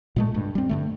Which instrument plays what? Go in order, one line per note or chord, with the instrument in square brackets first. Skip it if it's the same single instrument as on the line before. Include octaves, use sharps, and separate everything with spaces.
[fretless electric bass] A#2 G#3 A3
G2
G3 C4
G2 D3 A3